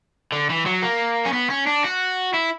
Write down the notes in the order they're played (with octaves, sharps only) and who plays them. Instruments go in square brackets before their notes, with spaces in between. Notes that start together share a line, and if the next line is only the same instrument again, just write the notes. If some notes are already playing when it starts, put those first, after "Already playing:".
[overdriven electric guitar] D3
E3
F#3
A#3
C#4
B3
C#4
D4
F#4
E4